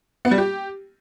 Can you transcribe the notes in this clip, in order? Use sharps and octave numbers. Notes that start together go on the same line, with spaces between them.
B3
G3
G4